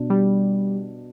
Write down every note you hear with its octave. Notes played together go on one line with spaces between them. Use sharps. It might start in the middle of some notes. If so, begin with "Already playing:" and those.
Already playing: B2 D4
G3